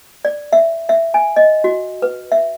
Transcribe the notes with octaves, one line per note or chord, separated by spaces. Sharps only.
D5
E5
E5
G#5
D#5
F#4
B4
E5